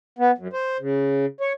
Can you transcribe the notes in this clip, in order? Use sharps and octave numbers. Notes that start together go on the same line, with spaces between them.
B3
F#2
C5
C#3
C#5